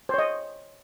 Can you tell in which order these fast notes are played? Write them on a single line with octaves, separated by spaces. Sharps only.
C5 C#5 D#5